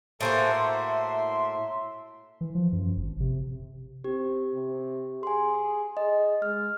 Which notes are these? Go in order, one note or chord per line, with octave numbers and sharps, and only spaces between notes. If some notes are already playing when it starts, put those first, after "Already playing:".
A2 A#3 F#4 G#4 A4 C5
E5 C6
E3
F3
F#2
G#1
C3
C4 G4
C3
G#4 G#5 C6
G#4 D#5
G#3 F6